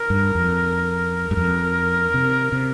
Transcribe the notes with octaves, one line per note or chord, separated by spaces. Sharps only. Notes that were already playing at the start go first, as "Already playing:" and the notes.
Already playing: A#4
G2
F2
G2
F2 A#4
C3
C3